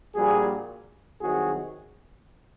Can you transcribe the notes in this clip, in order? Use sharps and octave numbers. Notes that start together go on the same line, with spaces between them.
A#1 A#2 G3 F#4 G#4
C2 C3 D#3 F#3 F#4 G#4